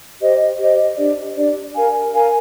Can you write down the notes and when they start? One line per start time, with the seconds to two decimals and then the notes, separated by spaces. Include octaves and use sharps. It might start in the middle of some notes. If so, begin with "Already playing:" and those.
0.20 G4 C5 D#5
0.59 G4 C5 D#5
0.97 D4 G4 D5
1.36 D4 G4 D5
1.74 A#4 F5 G#5
2.13 A#4 F5 G#5